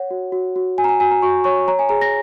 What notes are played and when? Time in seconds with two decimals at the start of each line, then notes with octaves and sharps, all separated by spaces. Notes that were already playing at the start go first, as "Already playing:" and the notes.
Already playing: C#5 F#5
0.11 F#4
0.32 F#4
0.56 F#4
0.78 F#4 G#5
0.84 A#5
0.89 G#5
1.00 F#4 G#5
1.11 A#5
1.22 F#4 C#6
1.44 C#5 C#6
1.68 C#5 A#5
1.79 G#5
1.89 G#4 A#5
2.01 A#6